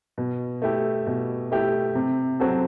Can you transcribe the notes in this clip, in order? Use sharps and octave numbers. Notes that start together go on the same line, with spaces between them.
B2
A3 E4 G4
B2
A3 E4 G4
C3
F#3 C4 F#4 A4